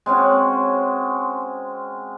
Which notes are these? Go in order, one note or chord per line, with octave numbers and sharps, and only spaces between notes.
G#3 C4 C#4 F#4